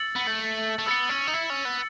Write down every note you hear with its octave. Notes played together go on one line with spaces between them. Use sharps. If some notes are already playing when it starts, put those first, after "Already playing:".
Already playing: E6 A6 C#7 F#7
B3
A3
A3
B3 E6 A6 C#7
C#4
D#4
E4
C#4
B3